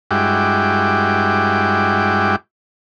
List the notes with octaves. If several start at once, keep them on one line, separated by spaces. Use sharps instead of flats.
G2 G#3 E4 F#4 G5 D6